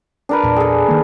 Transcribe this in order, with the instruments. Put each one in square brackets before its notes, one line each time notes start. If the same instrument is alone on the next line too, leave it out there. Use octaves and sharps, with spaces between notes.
[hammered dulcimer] D4 A#4 B4
[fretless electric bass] E2 A#2
[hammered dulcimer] G#4 A4
[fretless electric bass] D#3 A#3